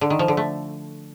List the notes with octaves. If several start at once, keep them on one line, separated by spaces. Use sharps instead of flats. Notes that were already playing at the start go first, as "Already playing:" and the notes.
D3
D#3
F3
D3
A3